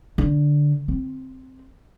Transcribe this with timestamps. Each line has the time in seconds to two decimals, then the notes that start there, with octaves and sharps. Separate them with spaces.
0.18 D3
0.88 C4